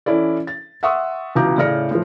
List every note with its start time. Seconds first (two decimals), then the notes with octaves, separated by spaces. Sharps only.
0.06 E3 C#4 E4 A4 D5
0.47 A6
0.83 E5 F#5 C6 C#6 D#6 E6
1.35 C#2 B2 E3 A#5 D6 G6
1.58 A2 C#3 D5 F6 A#6 C#7
1.91 A2 F3